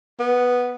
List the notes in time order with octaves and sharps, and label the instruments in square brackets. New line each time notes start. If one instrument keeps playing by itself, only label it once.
[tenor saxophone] B3